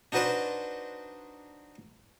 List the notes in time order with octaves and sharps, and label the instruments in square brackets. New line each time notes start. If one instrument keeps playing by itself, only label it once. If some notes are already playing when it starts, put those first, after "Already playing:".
[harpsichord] D4 D#4 F#4 B4 C5 D5